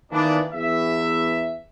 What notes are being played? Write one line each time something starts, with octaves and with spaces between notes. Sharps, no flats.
D#3 E3 A#3 B3 D4
E2 E5